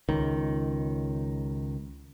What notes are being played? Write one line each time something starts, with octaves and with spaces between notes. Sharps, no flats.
C#2 D#3